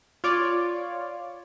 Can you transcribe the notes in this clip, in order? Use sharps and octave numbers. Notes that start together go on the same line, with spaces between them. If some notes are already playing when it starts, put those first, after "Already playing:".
F4 C#5 D5